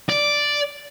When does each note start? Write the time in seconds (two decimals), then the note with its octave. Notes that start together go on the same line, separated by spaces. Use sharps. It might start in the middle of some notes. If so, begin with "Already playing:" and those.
0.09 D5